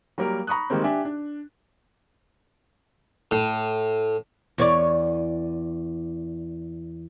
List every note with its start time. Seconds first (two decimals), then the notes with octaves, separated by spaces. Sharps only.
0.18 F#3 G3 A#3 A#4
0.47 A#5 B5 C#6 D#6 F#6
0.70 D#3 G3 G#3 A#3 C4
0.84 D4 G4 E5 G#5
1.05 D4
3.31 A2
4.58 E2 C#5 D5